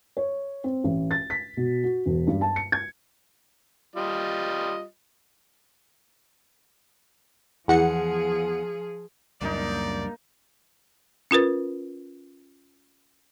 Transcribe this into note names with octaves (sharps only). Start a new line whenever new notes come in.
C#5
C4
A1
A6
B6
B2
F#4
E1
G2
A5
C#7
G#6
G3 F4 D#5
E2 F3 G#4 F#5 C#7
C#2 F#2 A#2 G3 D4 D#4 A#4 D5
C#4 F4 A#4 B4